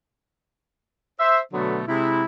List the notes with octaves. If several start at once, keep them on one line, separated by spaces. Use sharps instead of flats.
C5 E5
B2 D3 F#3 A3 B3
C3 G#3 E4